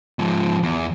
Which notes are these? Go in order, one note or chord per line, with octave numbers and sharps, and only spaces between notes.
G#2 F3
E2